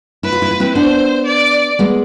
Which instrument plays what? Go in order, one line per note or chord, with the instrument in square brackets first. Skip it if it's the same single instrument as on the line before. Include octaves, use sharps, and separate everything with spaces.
[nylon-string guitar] E4 [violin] B4
[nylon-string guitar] F4
E4
F4
C4 E4
[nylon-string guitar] B3 D4 [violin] C5
[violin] D5
[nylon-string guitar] G#3 B3